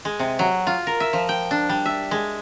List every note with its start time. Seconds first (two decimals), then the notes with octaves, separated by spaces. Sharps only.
0.05 G#3
0.19 C3
0.39 F#3
0.67 F4
0.87 A#4
1.00 E5
1.13 F3
1.29 G5
1.51 D4
1.69 G3
1.85 E5
2.11 G#3